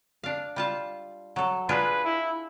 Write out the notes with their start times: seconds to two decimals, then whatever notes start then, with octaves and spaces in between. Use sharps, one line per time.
0.24 D4 F5
0.56 G3 F4 A5
1.36 F#3 A4
1.69 D4 F4 G#4 B4
2.04 E4